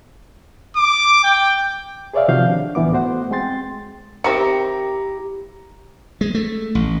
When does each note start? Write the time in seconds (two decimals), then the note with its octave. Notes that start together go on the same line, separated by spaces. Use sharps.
0.76 D6
1.24 G5
2.14 G#4 B4 C#5 D5 E5 F5
2.28 C3 D#3 F3 F#4 F5 G6
2.49 D4
2.75 C#2 A2 E3 B3 D6
2.92 A3 B3 F#4 C5 F#5
3.31 G#3 C4 G5 C6 A6
4.24 D#3 C4 E4 G4 A#5 C#7
6.21 G#3
6.35 A3
6.75 A1